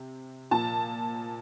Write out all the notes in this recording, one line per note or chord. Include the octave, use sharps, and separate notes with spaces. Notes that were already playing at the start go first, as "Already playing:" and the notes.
Already playing: C3
A#2 F3 A5